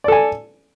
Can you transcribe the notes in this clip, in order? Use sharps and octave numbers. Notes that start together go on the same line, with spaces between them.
A4 D5 G#5